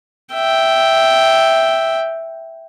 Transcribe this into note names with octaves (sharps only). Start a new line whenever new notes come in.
E5 G5